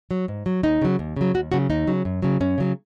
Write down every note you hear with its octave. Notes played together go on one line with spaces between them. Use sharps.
F#3
G#2
F#3
D#2 D#4
C#3 F#3
D#2
C#3 F#3
D#2 F#4
C#3 F#3 F#4
D#2 D#4
C#3 F#3
F#2
C#3 F#3
F#2 C#4
C#3 F#3